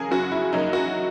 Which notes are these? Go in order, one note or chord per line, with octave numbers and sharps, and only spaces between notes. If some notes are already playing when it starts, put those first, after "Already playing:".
Already playing: C#3 F#3 G#4 A#4
F#2 F#4
E4
C#3 F#3 A#3 D#4
F#4